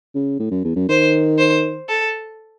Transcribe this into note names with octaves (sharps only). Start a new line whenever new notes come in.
C#3
A2
F#2
E2
F#2
D#3 C5
C5
A4